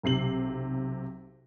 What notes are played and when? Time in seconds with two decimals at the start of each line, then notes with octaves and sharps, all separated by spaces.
0.03 B1 C3 C7 F#7